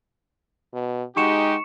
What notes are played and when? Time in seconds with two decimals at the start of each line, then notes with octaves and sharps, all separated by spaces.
0.74 B2
1.17 G#3 D#4 F#4 G4 C#6 C#7 E7